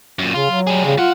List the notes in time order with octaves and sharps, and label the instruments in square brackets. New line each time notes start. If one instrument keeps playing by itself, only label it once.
[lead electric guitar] F#2 A#2
[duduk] C#3 [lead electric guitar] F4
[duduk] F#3
[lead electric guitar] G3 G#4
[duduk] C#3
[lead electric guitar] F#3 F#5 [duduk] F4